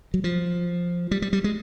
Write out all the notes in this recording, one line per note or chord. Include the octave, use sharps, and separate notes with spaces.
F#3
F3
G3
G3
G3
G#3